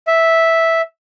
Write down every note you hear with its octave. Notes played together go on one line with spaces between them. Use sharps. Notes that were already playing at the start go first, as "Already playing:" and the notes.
E5